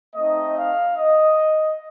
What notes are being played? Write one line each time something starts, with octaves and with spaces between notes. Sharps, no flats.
A3 C4 D#4 D#5
F5
D#5